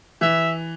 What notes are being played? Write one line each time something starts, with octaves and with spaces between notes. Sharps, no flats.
E3 E5